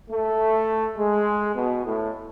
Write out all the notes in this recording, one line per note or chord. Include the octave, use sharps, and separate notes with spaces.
A3
G#3
B2
A2